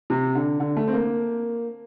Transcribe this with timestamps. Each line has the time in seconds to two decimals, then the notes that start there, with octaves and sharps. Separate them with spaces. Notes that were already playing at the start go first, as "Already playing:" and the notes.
0.10 C3
0.35 D3
0.60 D3
0.77 A3
0.87 C4
0.93 A#3